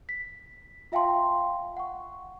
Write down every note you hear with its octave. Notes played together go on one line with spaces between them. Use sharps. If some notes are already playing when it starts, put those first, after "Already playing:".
B6
F4 E5 F5 G5 A5 C6
F#5 C#6